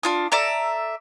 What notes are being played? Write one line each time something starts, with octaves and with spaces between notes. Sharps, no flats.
D4 F4 D#6
A4 D5 E5 A#5